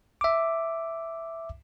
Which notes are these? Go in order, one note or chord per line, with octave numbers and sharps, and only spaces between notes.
E5 D6